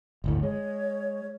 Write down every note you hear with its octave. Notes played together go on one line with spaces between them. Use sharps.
G1 D2 A2
G#3 C#5